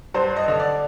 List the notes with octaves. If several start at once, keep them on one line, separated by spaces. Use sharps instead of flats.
G2 C5
D#5
D3
D5